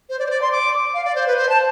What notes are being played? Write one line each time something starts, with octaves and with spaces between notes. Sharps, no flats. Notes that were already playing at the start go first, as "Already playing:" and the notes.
C5
D5
C5
D5
C6
D6
F5
D5
C5
B4
C5
A5